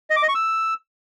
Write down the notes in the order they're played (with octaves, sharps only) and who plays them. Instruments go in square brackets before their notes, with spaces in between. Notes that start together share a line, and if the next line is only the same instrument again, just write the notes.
[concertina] D#5
D6
D#5
C#6
E6